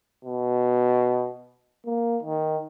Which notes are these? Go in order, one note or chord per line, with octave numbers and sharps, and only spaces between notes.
B2
A#3
D#3